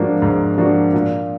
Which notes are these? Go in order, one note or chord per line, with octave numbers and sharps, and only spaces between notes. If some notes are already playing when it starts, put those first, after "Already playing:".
Already playing: G#2 F3 A#3 D4 F#4
G#2
F3 A#3 D4 F#4
A#2